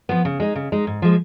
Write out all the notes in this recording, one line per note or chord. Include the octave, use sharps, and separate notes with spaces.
F3 B3
C#3
G#3 D#4
C#3
G#3 D#4
G#2
F3 G#3